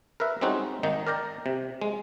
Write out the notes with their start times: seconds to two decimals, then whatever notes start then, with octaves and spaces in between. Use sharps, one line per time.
0.20 A#4 B4 E5
0.41 G3 G#3 C4 C#4 D#4 F#4
0.83 G#1 D#3 D#4
1.07 A#4 D5 G5 A#5
1.46 C3
1.82 G#3